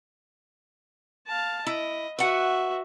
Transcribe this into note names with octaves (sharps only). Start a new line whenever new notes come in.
F5 A5
E4 D#5
F#4 B4 E5 F#5